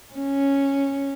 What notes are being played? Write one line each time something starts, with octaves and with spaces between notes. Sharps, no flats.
C#4